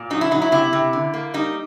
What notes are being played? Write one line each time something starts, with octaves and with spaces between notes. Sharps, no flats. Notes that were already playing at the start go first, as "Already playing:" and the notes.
Already playing: A#2
F#3 D#4
E4
F#3 D#4
E4
C3 E4
C3
D3
A#3
G3 D#4